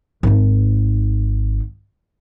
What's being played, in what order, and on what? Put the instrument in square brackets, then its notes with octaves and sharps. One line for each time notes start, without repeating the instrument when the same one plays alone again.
[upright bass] G#1 D#4